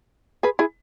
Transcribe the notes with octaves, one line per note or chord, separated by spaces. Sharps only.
G#4 B4
E4 G#4